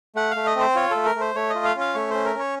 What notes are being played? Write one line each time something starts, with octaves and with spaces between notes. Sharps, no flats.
A3 F#5
A3 F5
D#5
C4 C5
F4 C#5
A3 A4
A#4
A3
C5
A3 C#5
D#5
F4
F5
C#4
F5
A3 C#5
C#4 C5
A#4
C#4 C#5